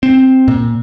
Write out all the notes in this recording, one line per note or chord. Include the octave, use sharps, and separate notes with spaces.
C4
A#2